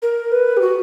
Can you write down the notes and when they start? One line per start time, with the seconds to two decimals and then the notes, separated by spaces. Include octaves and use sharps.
0.02 A#4
0.32 B4
0.57 G4
0.61 F#4